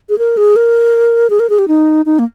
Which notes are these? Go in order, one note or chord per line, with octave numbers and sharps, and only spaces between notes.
G#4
A#4
G#4
A#4
G#4
A#4
G#4
G4
D#4
D#4
A#3